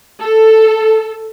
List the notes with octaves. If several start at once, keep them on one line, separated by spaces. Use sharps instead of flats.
A4